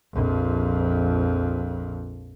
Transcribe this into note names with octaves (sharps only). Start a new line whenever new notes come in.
A#1 F2